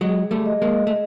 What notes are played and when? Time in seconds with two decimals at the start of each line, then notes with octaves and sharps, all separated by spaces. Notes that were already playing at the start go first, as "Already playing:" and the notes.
0.01 F#3 G#3 G#4
0.31 G3 A3
0.46 D#5
0.62 G#3 A#3
0.87 A3